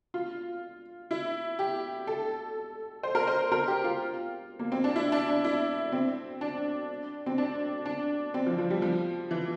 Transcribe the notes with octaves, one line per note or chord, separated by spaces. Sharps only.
F4
E4
G4
A4
C5
A#4
C5
A#4
G4
F4
A#3
C4
D4
E4
D4
D4
E4
C4
D4
C4
D4
D4
C4
F3
F3
G3
F3
E3